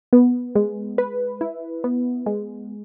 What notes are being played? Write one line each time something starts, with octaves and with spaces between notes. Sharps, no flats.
B3
G#3
B4
E4
B3
G#3